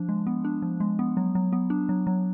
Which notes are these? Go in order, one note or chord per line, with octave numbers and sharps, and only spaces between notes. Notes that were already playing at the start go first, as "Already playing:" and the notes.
Already playing: F3 D4
G#3
B3
D4
F3
G#3
B3
F#3
F#3
B3
D4
F#3
F#3